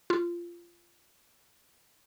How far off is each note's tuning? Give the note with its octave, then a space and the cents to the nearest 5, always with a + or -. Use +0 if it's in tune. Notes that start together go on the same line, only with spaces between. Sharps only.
F4 -20